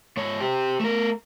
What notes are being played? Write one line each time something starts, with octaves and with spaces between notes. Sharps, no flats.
G#2 C#5
G4 C5
A3 A#4